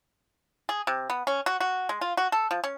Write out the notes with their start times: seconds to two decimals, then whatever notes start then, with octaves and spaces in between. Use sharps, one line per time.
0.69 G#4
0.87 C3
1.10 B3
1.27 C#4
1.46 F#4
1.60 F#4
1.89 G#3
2.01 F4
2.17 F#4
2.32 A4
2.51 F3
2.64 C#4